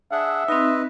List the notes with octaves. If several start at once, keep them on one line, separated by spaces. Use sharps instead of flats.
D4 G#4 E5 F#5
C4 D#4 B4 D#5